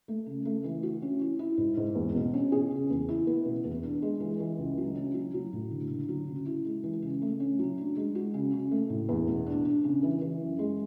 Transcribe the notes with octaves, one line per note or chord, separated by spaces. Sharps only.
A3
C#3
A3
E3
F#4
C#4
E4
E4
G#2
G#2
E2
B2
C#4
G#4
C#3
E2
E4
B3
B2
E2
D4
G#3
E3
E3
C#2
F#3
C#4
F#3
F#3
A2
D3
D3
F#3
C#3
E4
G#3
E3
C#3
A3
C#4
F#3
D4
G#3
F#4
C#3
C#3
A3
A2
E2
B2
D4
D4
C#3
E3
E3
F#2
G#3